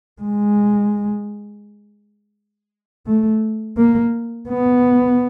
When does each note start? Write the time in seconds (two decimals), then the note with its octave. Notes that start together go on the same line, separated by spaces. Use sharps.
0.22 G#3
3.07 A3
3.78 A#3
4.49 B3